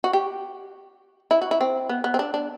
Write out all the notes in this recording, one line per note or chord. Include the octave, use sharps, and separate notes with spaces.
F#4
G4
E4
F#4
E4
C4
B3
B3
C4
D4
D4